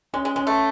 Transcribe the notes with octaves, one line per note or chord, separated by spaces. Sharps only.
G#3 C#4
G#3
G#3 C#4
A3